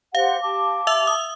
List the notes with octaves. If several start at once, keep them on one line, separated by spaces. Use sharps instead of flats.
G4 C5 F5 F#5
G4 A5 D6
E5 E6 F7
D#6